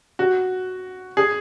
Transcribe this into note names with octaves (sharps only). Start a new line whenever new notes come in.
F#4
G#4